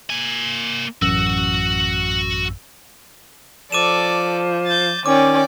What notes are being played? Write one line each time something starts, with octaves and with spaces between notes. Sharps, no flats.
A#3 G#5
A1 F#2 F#4 E6
F3 A4 D5 D6 D#7 E7
G6 A6
D#3 C#4 D5 G5 D6